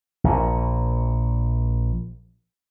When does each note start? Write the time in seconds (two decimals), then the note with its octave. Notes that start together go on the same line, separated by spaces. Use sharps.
0.24 A#1 A#2